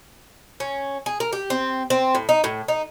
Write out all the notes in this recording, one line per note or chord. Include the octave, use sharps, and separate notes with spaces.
C#4
G#4
A#4
G4
C4
C4
A2
D#4
A2
D#4